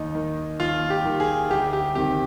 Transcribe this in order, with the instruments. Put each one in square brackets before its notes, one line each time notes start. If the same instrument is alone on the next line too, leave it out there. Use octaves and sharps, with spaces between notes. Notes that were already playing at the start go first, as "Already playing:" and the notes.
Already playing: [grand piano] D#2 D#4
D#3
D#2 F4
G4
D#3
G#4
D2 G4
G4
C3 D#3 G4